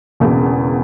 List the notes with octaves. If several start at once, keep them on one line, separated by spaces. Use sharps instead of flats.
E1 E2 C#3